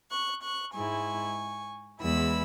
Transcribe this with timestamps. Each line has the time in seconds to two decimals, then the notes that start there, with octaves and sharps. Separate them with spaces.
0.10 C#6 F#6
0.43 C#6 F#6
0.74 G#2 G#3 E4 G#5 C#6
2.01 E2 E3 G#3 E4 B5 E6